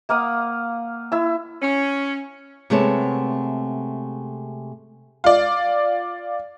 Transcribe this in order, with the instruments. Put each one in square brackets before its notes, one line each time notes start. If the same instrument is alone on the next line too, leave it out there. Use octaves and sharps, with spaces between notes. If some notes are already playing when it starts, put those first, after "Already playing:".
[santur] A#3 F5 F#5 D#6
E4 E6
[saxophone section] C#4
[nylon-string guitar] C3 G#3 A3 B3 C#5 A5
[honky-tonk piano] F4 D5